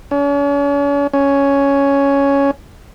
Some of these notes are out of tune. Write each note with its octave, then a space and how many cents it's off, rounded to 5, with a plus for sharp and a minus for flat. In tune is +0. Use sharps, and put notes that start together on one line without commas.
C#4 +40
C#4 +5